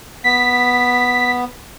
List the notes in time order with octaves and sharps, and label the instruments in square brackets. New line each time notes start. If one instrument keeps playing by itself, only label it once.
[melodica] B3 [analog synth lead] B6